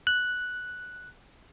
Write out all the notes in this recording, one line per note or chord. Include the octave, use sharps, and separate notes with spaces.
F#6